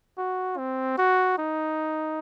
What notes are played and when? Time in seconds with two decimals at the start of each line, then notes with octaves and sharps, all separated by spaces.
0.18 F#4
0.57 C4
0.98 F#4
1.38 D#4